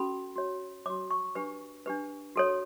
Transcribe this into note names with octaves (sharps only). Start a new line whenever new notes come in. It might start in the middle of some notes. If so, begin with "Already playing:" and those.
Already playing: C#4 F#4 A4 B5
F#4 C#5
F#4 C#5 D6
C#6
D4 G4 B4
D4 G4 B4
F#4 A4 C#5